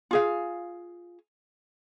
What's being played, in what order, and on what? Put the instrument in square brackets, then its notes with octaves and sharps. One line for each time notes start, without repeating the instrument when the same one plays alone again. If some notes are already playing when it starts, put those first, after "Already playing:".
[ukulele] F4 G#4 F5